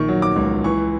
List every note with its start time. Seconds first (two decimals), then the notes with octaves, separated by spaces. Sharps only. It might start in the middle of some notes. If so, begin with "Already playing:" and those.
Already playing: A#1 D#3 C#6
0.08 F#3
0.22 D6
0.36 C#2
0.64 E3 C#6